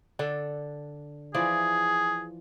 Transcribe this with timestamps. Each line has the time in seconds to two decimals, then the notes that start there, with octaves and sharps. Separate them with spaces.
0.19 D3 D4 A4
1.34 E3 F3 G#4 D5